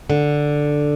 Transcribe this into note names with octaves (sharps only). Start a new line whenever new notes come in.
D3